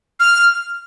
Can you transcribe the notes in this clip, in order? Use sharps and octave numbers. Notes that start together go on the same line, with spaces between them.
F6